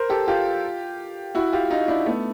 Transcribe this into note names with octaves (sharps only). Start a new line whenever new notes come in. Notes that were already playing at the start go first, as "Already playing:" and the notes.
Already playing: A#4 C5
G4 A4
F4 G4
E4 F#4
F4 G4
D#4 F4
D4 E4
A3 B3